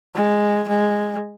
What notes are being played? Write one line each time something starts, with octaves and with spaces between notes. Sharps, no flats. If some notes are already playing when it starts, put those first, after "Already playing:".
G#3
G#3